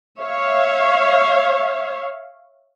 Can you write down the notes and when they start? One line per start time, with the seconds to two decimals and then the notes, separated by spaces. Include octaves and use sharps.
0.20 C#5 E5 F5